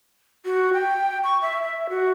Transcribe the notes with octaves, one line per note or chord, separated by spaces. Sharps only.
F#4
G5
C#6
E5
E5
F#4